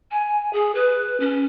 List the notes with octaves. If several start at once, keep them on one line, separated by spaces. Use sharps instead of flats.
G#5
G#4
B4
C#4